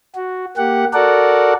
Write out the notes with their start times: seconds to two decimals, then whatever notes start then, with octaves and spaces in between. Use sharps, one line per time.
0.15 F#4
0.57 A#3 G4 F#5
0.93 F#4 A4 A#4 D5 F#5